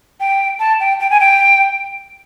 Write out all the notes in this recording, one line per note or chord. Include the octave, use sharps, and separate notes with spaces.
G5
A5
G5
G5
G#5
G5